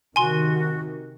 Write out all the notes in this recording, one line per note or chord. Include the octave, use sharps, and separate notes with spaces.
C3 D#3 F#4 G#5 C6